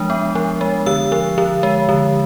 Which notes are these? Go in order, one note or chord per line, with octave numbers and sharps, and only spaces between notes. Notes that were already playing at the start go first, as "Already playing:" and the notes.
Already playing: F3 G#3 D4 D#6
B3
F3
G#3
D3 E6
F3
D3
G#3
D3